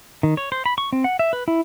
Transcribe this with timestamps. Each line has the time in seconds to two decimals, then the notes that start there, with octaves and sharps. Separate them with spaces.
0.23 D#3
0.37 C#5
0.52 C5
0.66 B5
0.78 C#6
0.93 C4
1.04 F#5
1.19 E5
1.33 B4
1.48 E4